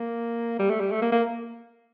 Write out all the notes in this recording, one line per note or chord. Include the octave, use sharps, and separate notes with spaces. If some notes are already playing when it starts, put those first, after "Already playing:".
Already playing: A#3
G3
A3
G3
A3
A#3
A#3